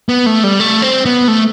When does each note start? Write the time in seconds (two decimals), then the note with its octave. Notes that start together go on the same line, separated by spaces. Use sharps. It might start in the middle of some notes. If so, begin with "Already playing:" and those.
0.09 B3
0.26 A3
0.44 G3
0.60 A3
0.82 C4
1.06 B3
1.28 A3